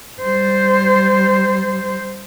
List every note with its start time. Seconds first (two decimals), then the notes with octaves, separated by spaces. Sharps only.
0.22 G3 C5